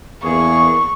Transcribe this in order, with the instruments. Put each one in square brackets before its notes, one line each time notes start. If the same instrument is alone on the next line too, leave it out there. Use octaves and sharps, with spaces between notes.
[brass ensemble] E2 A#3 G#4 [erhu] C#6